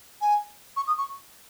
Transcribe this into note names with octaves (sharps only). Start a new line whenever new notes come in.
G#5
C#6
D#6
C#6